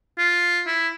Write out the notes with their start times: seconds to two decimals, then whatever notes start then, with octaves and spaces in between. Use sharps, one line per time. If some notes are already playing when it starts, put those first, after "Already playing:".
0.18 F4
0.67 E4